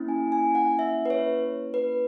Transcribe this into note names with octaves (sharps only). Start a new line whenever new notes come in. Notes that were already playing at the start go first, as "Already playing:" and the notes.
Already playing: A#3 C#4 E4
G#5
G#5
F#5
E5
B4
C#5
B4